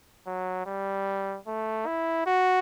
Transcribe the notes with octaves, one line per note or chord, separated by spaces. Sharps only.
F#3
G3
A3
E4
F#4